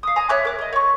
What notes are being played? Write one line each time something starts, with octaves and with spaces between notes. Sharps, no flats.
F5 D#6
G#5 A#5 D#6
C#5 E5 D6 F#6
A#4 D6
A#4 D#5
C#5 C#6